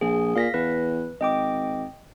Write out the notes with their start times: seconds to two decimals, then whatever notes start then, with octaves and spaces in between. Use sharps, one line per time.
0.01 A#1 G#4
0.36 A#2 F5 A#6 B6
0.54 E2 B4
1.21 G#1 D#5 G5 D6